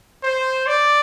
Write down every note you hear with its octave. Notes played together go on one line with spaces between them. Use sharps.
C5
D5